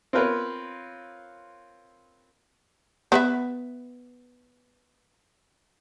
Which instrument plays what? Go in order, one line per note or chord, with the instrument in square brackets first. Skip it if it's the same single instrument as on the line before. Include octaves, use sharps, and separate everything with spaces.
[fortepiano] C4 F4 A#4 B4 C#5
[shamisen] B3 B4 E5